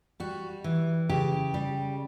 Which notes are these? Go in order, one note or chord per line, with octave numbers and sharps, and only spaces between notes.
G3 F#4
E3
C#3 G4
G3